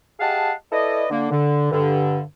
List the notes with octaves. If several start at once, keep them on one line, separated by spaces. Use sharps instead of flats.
G4 G#4 D#5 F5 F#5 A5
E4 A4 B4 D5 D#5
D3 A#3
D3
G2 D3